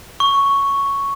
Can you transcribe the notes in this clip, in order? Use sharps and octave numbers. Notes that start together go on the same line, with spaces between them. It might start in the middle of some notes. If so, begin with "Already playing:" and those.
C#6